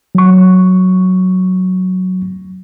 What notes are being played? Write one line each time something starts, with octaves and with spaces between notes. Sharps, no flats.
F#3 C#6